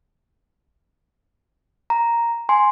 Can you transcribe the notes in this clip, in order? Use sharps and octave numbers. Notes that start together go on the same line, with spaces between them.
A#5
G#5 C6